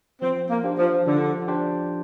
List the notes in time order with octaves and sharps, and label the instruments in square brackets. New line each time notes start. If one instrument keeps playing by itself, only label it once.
[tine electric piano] F3 [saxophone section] C4
[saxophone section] A#3
[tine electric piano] D4 G4 C5
[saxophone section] F3
[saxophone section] D3 [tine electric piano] F3
[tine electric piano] D4 G4 C5